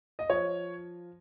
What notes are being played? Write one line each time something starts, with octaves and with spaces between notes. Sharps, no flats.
D#5
F3 C#5